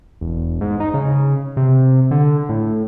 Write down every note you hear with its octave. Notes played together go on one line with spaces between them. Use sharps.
E1
G#2
D#4
C#3
C3
D3
A2